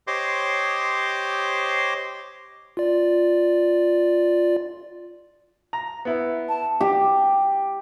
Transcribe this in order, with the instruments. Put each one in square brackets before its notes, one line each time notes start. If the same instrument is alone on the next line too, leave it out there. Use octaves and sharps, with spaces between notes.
[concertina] G4 C5 C#5 D#5 C6 D6
[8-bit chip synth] F4 D5
[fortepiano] A#5
B3 E4
[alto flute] A5
[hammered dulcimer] G4